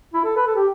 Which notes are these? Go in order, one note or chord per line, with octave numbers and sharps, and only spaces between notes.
E4
A4
B4
A4
G4